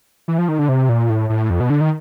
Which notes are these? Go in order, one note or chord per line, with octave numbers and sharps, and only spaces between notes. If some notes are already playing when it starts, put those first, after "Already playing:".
E3
F3
D#3
D3
C3
A#2
A2
A2
F2
B2
D3
D#3